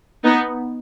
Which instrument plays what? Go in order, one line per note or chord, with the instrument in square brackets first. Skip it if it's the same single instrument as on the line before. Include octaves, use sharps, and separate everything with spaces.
[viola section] B3 D#4